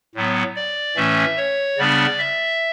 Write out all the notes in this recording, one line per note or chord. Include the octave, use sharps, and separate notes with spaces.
A2 F#3 B3
D5
A2 E3 A3 C#4 E5
C#5
C#3 G3 B3 D4 D5
E5